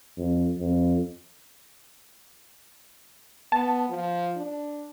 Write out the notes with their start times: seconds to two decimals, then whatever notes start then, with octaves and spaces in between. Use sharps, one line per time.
0.17 F2
0.58 F2
3.52 B3 A5
3.89 F3
4.36 D4